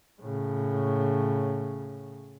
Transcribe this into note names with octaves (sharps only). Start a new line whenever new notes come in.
A2 C#3